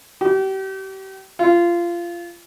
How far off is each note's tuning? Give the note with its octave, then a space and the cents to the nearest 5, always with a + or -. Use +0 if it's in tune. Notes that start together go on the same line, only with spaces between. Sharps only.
G4 -35
F4 -20